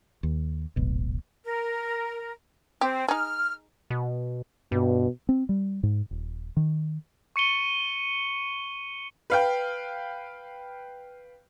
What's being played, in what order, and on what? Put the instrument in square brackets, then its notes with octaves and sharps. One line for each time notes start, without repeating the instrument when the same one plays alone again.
[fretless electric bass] D#2
D1 G#1 B2
[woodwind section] A#4
[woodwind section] C4 [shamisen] G4
[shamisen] D#4 G#4 [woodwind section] F6
[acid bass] B2
[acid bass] G2 [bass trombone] B2
[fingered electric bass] C4
G3
G#2
D#1
D#3
[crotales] C#6 C#7 D#7 G7
[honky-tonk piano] B4 F5 G5